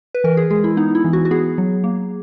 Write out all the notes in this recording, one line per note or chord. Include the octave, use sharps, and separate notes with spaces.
B4
E3 A#4
G#4
G#3 G#4
E4
B3 D#4
E4
E3
F#4
F#4
B3 G#4
F#3
A#3